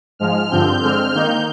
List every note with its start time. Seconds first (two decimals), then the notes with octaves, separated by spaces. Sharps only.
0.19 G#2 F3 G#3 F6
0.51 G2 D3 F3 C4 G6
0.82 D3 G#3 C4 F6
1.14 D#3 A#3 D#4 G6